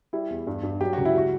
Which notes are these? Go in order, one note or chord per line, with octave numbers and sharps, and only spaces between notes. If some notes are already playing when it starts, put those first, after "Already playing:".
G3 E4
E2
G2
G2
F#3 G4
C#2 F#4
E4
G3 F#4